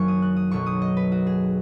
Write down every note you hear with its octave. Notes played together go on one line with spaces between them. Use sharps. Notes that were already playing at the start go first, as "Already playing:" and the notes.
Already playing: F#1 F#2 D#3 F#3 G#5 C#6
D#6
F#6
D#6
B1 B2 F#3 C#6
D#6
D#5
B4
F#4
G#4